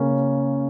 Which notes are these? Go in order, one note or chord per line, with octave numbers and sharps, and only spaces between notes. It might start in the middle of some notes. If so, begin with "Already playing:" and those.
Already playing: C#3 A#3 C#4